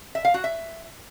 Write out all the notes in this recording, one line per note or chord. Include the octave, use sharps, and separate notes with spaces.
E5
F5
F#4
E5